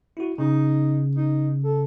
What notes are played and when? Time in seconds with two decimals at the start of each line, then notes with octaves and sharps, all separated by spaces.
0.17 E4 F#4
0.38 C#3 D#4
1.15 D#4
1.65 A4